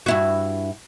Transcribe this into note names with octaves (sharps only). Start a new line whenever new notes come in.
G2 E4 F#4